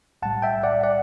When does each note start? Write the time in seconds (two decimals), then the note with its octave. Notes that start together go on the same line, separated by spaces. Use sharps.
0.22 B1 A2 G3 F#5 A5
0.42 E5 G5
0.63 D5 F#5
0.83 D5 F#5